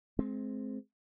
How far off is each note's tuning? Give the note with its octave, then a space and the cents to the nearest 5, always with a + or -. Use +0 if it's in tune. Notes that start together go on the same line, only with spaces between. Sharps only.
G#3 +30 C4 +0